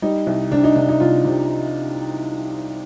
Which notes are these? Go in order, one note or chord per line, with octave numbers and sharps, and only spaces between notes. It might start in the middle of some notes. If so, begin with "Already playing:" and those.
G3 D#4
C2
C3 D4
D#4
C3 D4
D#4
C2 F4
C3